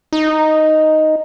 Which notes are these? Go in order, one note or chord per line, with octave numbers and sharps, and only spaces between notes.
D#4